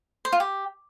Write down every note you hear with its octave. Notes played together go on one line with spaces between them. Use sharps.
C5
F4
G4